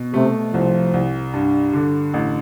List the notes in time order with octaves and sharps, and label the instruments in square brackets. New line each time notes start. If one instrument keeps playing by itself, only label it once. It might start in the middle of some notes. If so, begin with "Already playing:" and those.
Already playing: [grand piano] B2
[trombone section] C3 [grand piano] A3
[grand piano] C2 [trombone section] F3
[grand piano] C2
G2
D3
A1